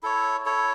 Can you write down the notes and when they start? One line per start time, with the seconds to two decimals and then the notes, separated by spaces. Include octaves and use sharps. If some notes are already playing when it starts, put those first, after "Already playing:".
0.03 E4 A4 C#5
0.46 E4 A4 C#5